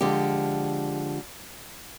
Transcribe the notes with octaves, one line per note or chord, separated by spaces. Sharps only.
D3 F3 G#3 G4